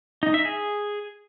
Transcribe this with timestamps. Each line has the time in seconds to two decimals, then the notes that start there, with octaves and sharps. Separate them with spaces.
0.23 D#4
0.34 E5
0.45 G#4